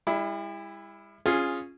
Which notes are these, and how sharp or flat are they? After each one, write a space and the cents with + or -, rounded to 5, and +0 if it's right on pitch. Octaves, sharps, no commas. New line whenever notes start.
G3 +45 E4 +0
C#4 -15 F4 +0 G#4 +0